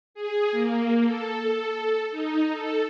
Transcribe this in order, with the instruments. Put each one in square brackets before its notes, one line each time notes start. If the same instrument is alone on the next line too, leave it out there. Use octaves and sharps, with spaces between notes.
[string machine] G#4
A#3
A4
D#4
A4